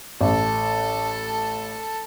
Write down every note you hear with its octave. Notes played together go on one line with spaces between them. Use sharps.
A1 A4 A5